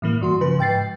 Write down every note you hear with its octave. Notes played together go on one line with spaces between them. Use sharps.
A2 E3 A#3
G2 F#4 C6
C#3 F3 B4
G#2 G5 A6 C7